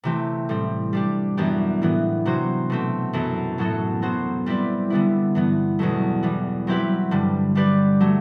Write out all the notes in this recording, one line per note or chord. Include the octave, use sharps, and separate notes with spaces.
C3 E3 A3 C4 G4
A2 G3 C4
G3 D4 G4
F#2 E3 B3 D4 G4
A2 E3 B3
C3 F#3 B3 F#4 C5
B2 A3 C4
F#2 E3 B3 E4 A4
A2 F#3 B3 F#4 A4
F#3 B3 F#4 C5
G3 C4 E4 B4 D5
D3 G3 B3 E4
G2 E3 B3
E2 B2 F#3 A3
E3 G3 B3
F#3 C4 E4 G4 B4
G2 D3 G3
G3 D4 G4 B4 D5
F#3 A3